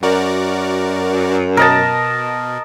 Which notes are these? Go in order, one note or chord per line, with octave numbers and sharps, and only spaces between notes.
F#2 F#4 A#4 D5
B2 A#4 D#5 A5